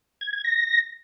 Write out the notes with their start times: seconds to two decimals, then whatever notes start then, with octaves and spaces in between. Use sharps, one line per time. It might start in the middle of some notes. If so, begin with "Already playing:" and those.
0.21 G#6
0.33 G#6
0.44 A#6